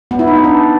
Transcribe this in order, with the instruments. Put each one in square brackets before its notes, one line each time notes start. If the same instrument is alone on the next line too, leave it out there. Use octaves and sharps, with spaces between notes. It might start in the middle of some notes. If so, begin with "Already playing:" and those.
[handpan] B3
E4
D#4
B3
D4